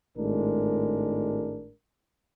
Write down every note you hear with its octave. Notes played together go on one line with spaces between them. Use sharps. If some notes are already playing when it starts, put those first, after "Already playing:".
G#1 A2 G#3 D4 A#4